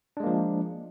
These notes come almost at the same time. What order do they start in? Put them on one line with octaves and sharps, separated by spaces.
D4 G#3 A#3 F3